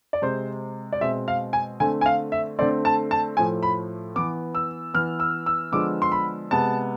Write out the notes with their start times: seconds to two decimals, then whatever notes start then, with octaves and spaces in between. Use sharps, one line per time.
0.13 D5
0.22 C3 G#3 C4 C5
0.93 D5
1.01 B2 G#3 C4 E5
1.28 F5
1.53 G#5
1.80 D3 A3 C4 G#5
2.01 G#5
2.06 F5
2.32 E5
2.59 D3 A3 C4 D5
2.85 A5
3.11 A5
3.37 A2 F3 A3 G#5
3.63 B5
4.15 E3 B3 D6
4.55 E6
4.94 E3 B3 F6
5.20 E6
5.46 E6
5.72 D3 F3 G#3 B3 D6
6.02 C6
6.12 B5
6.51 C3 G#3 B3 A5